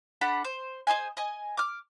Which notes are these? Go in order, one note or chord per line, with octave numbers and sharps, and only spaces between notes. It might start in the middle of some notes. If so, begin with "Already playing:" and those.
D4 A4 F#5 B5
C5
G#4 C5 D#5 G#5
D#5 G#5
D6 F6